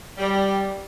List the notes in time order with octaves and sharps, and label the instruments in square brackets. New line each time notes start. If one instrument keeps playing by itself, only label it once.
[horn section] G3